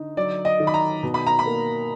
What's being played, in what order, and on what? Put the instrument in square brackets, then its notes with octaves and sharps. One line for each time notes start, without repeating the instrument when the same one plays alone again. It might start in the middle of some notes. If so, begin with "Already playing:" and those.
Already playing: [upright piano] D3 D#4
F#3 D5
D#5
D#3
B5
A#5
B2
B5
A#5
B5
A#3